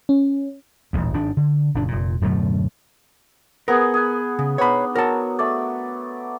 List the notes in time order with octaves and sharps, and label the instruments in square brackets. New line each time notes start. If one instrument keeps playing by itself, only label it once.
[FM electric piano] C#4
[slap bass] D#1 A1 D#2
G#1 G#2 D4
D3
F#1 A#2 D4
F1 A#2
D1 F#2 B2 A3
[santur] B3 G#4 [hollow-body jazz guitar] A#4
[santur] G#4 B4
[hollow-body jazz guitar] C#3
[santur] B3 D4 D#4 [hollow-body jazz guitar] C#5 B5
[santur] F#3 [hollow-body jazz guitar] A#4 A5
[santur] A3 D5